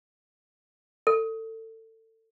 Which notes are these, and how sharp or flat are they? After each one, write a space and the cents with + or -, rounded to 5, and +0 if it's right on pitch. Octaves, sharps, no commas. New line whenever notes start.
A4 +25